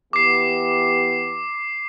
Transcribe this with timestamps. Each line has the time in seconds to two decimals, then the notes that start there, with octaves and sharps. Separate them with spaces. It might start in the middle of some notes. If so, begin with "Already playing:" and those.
0.13 E3 B3 G4 D6 C7